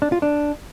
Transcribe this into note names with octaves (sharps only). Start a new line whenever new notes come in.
D4
F4
D4